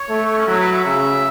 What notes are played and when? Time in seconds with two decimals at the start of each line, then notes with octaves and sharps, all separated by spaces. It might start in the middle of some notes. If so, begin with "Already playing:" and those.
Already playing: C#5
0.09 A3
0.38 C#4
0.47 F#3 E4
0.60 B4
0.72 E5
0.85 C#3 E5